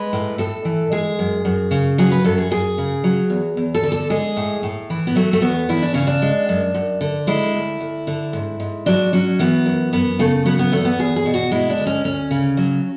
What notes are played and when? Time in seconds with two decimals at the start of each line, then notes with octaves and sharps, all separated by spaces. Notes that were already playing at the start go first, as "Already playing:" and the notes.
Already playing: G#3 B4
0.13 A2
0.38 A2 A4
0.65 E3
0.92 G#3 G#4
1.19 F#2
1.45 F#2
1.71 C#3
1.98 F#3 G#4
2.11 B4
2.24 F#2 A4
2.38 G#4
2.51 F#2 G#4
2.78 C#3
3.04 F#3
3.30 E2
3.57 E2
3.75 A4
3.83 D3
3.92 A4
4.10 G#3 G#4
4.37 A2
4.63 A2
4.90 E3
5.07 B3
5.16 F#3 A3
5.33 A3
5.42 E2 B3
5.69 E2 E4
5.82 D4
5.94 C#3 C#4
6.07 D4
6.22 G#3
6.49 F#2
6.74 F#2
7.01 D3
7.27 G#3 E4
7.54 D2
7.81 D2
8.07 D3
8.33 G#2
8.60 G#2
8.86 F#3 D4
9.13 F#3 C#4
9.39 E3 B3
9.66 F#2
9.93 F#2 B3
10.19 C#3 A3
10.46 F#3 B3
10.59 B3
10.72 E2 A3
10.85 B3
10.99 E2 G#4
11.16 G#4
11.26 B2
11.34 F#4
11.52 G#3 E4
11.70 D4
11.78 D2
11.87 C#4
12.04 D2 C#4
12.31 C#3
12.57 F#3